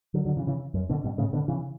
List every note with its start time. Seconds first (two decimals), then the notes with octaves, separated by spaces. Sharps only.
0.14 D3 F#3
0.25 D3 F#3
0.37 C#3 E3
0.47 C#3 E3
0.74 F#2
0.89 B2 D3
1.04 G2 B2
1.18 A2 C#3
1.33 B2 D3
1.48 C#3 E3